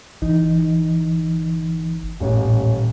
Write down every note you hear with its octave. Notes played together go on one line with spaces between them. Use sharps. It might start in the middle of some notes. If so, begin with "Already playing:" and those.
G1 E3 D#4
D#1 A1